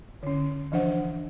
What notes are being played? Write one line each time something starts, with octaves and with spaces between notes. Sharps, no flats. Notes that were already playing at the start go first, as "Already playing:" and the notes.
D3 C#4
E3 F3 D4 C5 F#5